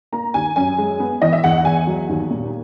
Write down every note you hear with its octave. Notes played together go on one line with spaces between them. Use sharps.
A#3 A#5
D#2 G#5
F#2 G#5
G#3
B3
E3 D#5
E5
E2 F#5
E2 G#5
F#3
D#2
A#2